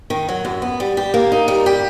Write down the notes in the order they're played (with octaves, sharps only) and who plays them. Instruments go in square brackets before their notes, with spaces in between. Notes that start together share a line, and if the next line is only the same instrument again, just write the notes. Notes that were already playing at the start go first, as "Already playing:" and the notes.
[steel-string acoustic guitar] D#3
F#3
F#2
B3
G3
G4
A#3
D#4
G3
G4